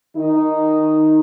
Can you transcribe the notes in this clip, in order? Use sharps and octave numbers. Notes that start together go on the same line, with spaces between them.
D#3 D#4